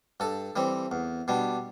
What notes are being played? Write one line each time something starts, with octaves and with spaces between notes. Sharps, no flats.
G2 A4
E3 G3 C4
E2
B2 G3 D4